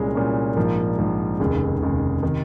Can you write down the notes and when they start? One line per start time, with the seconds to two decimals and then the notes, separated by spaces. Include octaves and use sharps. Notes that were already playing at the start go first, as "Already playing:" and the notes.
Already playing: C2 A#2 G#3 C#4
0.15 C2 A#2 G#3 C#4
0.56 A#1 G#2 F3 A#3
0.98 A#1 G#2 F3 A#3
1.39 F1 D#2 C#3 G#3
1.82 F1 D#2 C#3 G#3
2.23 C3 D#3